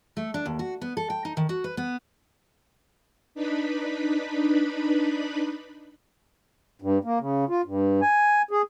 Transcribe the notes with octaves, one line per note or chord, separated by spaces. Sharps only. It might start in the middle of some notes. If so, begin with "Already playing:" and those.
A3
D4
D#2
F#4
B3
A4
G5
D#4
D#3
F#4
B4
B3
D4 D#4 B4 B5
G2
A#3
C#3
F4
G2
G#5
G#4